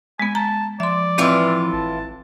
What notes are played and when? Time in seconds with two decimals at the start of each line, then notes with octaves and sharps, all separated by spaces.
0.20 G#3 B3 G#5
0.35 A5 A#5
0.80 F3 D5 E5 C6
1.18 A2 E3 C4 F4
1.73 G#1 A5